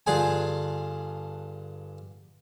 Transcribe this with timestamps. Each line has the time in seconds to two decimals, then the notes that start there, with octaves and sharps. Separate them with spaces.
0.07 G2 D3 F4 G#4 G#5